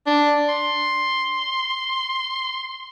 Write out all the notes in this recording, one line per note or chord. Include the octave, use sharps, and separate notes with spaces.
D4
C6